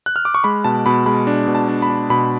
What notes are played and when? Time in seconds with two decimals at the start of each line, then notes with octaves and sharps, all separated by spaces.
0.06 F#6
0.16 F6
0.25 D6
0.35 C#6
0.44 G#3 B5
0.64 B2 A5
0.86 B2 B5
1.06 G#3 B5
1.27 D4
1.47 B2
1.55 A5
1.68 D4
1.82 B5
1.90 D4
2.10 B2 B5